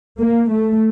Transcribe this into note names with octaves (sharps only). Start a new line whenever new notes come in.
A#3
A3